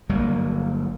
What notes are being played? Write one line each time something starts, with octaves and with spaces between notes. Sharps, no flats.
G1 F#3 A#3